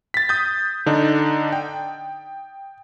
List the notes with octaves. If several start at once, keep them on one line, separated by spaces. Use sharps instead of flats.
A6 B6
D#6 G6
D3 D4 D#4
G5